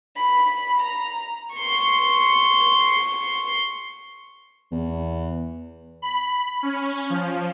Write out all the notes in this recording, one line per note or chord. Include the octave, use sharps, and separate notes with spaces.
B5
A#5
C6 C#6
E2
B5
C#4
F3